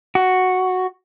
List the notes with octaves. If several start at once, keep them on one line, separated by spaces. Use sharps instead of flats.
F#4